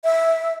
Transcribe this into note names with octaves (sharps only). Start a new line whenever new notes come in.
E5